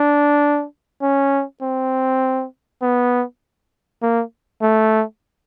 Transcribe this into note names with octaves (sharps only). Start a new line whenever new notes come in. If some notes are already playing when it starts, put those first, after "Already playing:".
Already playing: D4
C#4
C4
B3
A#3
A3